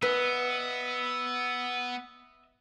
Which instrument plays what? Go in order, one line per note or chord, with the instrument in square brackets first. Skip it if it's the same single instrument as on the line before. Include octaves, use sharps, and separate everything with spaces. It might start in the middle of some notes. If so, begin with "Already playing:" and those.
[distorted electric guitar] B3 [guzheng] B4 [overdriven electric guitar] D#5 E5